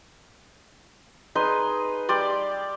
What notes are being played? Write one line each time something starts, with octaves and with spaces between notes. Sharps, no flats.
D#4 G#4 B4 C6
G3 D5 C6